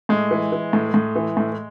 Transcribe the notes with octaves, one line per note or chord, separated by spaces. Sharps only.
A2 G#3
E3
E3
A2
A2
E3
A2